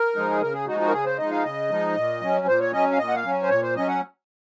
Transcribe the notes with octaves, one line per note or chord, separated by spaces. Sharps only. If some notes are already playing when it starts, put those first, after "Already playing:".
Already playing: A#4
F3 G#3 D#4
G#4
C#3 A#4
G#4
F3 G#3 D#4 F#4
F#4
A#4
C#3 G#4
C5
F3 G#3 D#4 D#5
F5
C#3 D#5
F3 G#3 D#4
A#2
F#3 C#4
A#2 C5
C#5
F#3 C#4 D#5
F5
A#2 D#5
F#5
F5
F#3 C#4
C5
A#2 C#5
C5
F#3 C#4 D#5
F#5